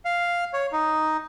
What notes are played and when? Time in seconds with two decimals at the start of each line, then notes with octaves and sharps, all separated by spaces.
0.05 F5
0.53 C#5
0.72 D#4